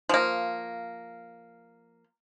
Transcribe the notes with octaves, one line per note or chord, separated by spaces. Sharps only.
F3 A#3